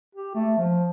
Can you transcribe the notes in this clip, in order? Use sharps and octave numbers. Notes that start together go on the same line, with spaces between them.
G4
A3
F3